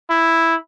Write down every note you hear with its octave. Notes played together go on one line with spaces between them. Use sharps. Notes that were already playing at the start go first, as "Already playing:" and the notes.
E4